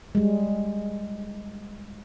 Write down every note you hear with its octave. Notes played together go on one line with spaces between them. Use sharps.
G3 G#3